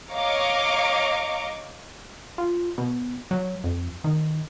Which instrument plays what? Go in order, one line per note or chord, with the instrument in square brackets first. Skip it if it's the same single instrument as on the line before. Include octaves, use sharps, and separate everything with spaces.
[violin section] C#5 D#5 F5 A#5 C#6 D6
[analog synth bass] F4
B2
F#3
F2
D#3